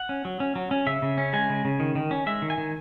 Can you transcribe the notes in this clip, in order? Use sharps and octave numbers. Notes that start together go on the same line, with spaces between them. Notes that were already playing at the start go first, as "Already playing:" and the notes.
Already playing: F#5
C#4
F#3
C#4
F#3
C#4
C#3 E5
C#3
C#4
G#3 G#5
C#3
C#3
D#3
D#3
C#4
G#3 E5
D#3
G#5
D#3